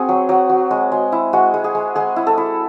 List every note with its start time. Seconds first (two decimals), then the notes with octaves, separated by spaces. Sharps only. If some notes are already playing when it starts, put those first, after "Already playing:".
Already playing: C4 F#4 G#4
0.09 F#3
0.29 F#3
0.50 F#3
0.71 G#3
0.92 G#3
1.12 E4
1.33 G#3 F#4
1.54 G#3
1.64 G#4
1.75 G#3
1.95 G#3 G#4
2.16 E4
2.27 A4
2.37 E4